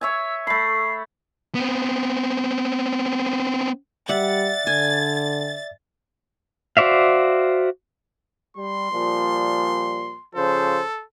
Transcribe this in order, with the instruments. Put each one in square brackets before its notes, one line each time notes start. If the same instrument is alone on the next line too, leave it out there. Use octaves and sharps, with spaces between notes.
[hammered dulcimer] C#5 E5 G#5 [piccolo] E6
[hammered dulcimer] A3 B5 [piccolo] C7
[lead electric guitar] B3 C4
[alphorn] G3 [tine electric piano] D5 E5 [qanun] F#5 [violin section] A6
[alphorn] D3 [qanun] G#5
[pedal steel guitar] F#4 C5 D5 E5 F5
[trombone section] G3 [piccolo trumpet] C6
[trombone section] A#2 F3 G3
[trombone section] C#3 F3 C5 [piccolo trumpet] A4